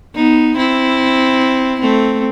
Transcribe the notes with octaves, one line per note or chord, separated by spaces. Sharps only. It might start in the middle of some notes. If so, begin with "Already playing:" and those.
B3 D#4
C4 E4
A3 C4